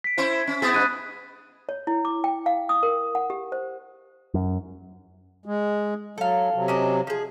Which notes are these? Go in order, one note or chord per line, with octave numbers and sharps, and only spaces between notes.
B6 D7
C#4 E4 C5
C#4
B3 E4 G#4 D#6 A6 B6
G2 B5 F#6 D#7
C#5
E4
D6
G5
F5
D#6
A#4
F#5
G4
C5
F#2
G#3
F#3 A4 F5
C3 F#3
C#4 D4 D#5
F3 G#4